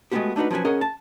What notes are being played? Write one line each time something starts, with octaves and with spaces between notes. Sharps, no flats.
G#3 A3 B3 C4 F#4 G4
A3 D4 D#4 F#4 B4
F3 F#3 C#4 B4 G#5
C#4 G#4 A#4 D#5 F#5
A5